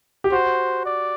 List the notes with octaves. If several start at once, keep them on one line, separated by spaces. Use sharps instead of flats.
G4
F#4 C5
D5